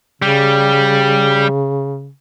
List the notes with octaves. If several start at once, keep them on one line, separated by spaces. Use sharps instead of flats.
C#3 G3